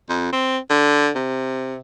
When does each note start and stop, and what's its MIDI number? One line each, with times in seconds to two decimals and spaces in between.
0.09 0.30 41
0.33 0.58 60
0.70 1.09 50
1.16 1.77 48